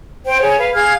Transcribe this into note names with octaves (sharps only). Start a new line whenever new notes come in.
C5 G5
G#4 C#5
B4 F5
G#4 F5 F6 G#6